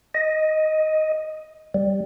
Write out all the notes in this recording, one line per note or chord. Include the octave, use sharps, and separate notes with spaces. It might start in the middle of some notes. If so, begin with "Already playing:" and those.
D#5
G3